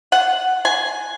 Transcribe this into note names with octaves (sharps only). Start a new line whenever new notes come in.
F#5
G#5